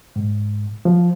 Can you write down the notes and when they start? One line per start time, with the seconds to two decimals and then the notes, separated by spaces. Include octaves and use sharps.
0.16 G#2
0.85 F3